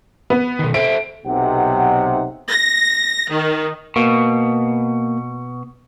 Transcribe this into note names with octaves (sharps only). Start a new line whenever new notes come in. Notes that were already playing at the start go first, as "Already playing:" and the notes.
B3
B2 D#3
A4 C5 E5 D7
B1 C3 D#4 F#5
A#6
D#3
B2 A#3